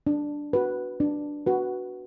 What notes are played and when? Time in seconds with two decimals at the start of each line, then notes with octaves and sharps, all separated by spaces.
0.07 D4
0.53 F#4 B4
1.00 D4
1.46 F#4 B4